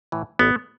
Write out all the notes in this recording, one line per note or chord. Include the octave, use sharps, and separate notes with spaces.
A2 E3
A1 B3